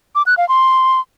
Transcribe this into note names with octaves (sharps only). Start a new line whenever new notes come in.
D6
F#6
F5
C6